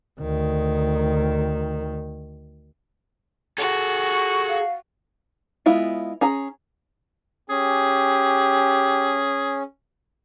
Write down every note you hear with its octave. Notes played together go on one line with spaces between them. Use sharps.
D2 D#3
F#4 G#4 A4
C#6
F5
G#3 B3 E4 F4
C#4 G#4 A#5
C#4 G4 G#4